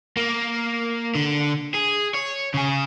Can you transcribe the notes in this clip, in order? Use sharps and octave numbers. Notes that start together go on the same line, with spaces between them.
A#3
D3
G#4
C#5
C#3 G#4